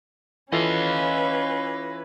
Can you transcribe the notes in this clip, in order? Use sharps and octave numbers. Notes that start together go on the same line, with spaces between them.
E3 C#4 F4 A4 B4 D#5 F5